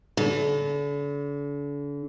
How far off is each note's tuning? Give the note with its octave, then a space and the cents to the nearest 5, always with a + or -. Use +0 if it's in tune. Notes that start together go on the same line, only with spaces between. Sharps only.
D3 -40